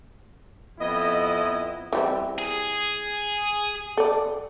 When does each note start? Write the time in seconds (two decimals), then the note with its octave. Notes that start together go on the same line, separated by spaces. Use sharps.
0.80 F2 B3 E4 D#5
1.93 E3 G3 C4
2.38 G#4
3.97 A4 D5